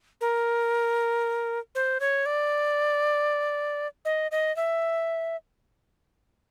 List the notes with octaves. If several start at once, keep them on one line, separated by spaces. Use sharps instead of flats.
A#4
C5
C#5
D5
D#5
D#5
E5